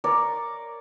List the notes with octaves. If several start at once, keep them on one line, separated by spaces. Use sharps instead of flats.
A#4 C#5 D5